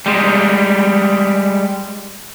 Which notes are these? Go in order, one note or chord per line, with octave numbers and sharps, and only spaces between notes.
G3 G#3